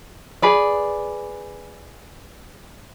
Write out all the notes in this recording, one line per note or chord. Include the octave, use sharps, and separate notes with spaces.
G#4 B4 D5